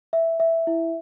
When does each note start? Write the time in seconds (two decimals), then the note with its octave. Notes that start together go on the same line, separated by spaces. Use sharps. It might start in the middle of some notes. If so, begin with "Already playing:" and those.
0.13 E5
0.40 E5
0.67 E4